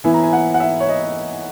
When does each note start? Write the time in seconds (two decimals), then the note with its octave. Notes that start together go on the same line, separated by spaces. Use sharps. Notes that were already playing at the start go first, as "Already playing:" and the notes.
0.04 E3 B3 E4 G#5
0.14 A#5
0.23 G#5
0.33 F#5
0.54 F#5
0.60 E5
0.80 C#5
0.89 D#5